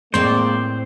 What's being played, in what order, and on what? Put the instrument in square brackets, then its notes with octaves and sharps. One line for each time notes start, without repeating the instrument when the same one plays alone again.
[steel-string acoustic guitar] A2 C4 [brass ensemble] G#3 A#3 D5 [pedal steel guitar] C5